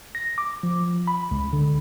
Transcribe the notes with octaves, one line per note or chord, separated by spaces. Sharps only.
A#6
D6
F3
B5
C#2
D3